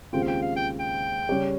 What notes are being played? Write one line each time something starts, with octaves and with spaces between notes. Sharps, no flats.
D#2 C#3 G#3 C4 F4 G5
F5
G5
F5
G5
G5
C#3 G3 C#4 G4 C#5